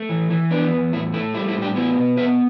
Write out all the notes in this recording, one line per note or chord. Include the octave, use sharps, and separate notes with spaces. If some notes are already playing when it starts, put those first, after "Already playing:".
Already playing: A3
E3
E3
B3 D4
E2
A2 E4
A3 E4
G3 E4
E4
A2
D4 G4
B3 E4
B2
B3 B4 E5